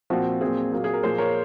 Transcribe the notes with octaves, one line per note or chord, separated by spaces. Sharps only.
A#2 F3 C4 F#4
A#2 F#3 C4 G#4
A#2 F#3 A#3
G#4
A#4
A#2 F3 A#3 G#4 C5
A#4 C#5